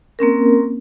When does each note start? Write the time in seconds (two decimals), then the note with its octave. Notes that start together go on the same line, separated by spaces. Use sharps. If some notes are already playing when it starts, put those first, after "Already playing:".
0.19 A#3 C4 C#4 A#4